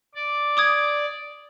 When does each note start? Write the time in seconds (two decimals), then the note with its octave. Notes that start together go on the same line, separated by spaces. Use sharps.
0.15 D5
0.57 D6 D#6 G#6